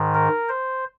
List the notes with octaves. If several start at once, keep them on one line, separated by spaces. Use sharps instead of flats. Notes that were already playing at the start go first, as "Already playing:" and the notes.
Already playing: G#2 D#3
A#4
C5